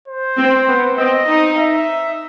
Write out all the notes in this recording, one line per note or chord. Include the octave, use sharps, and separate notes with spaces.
C5
C4
B3
C4 D#5
D#4
E5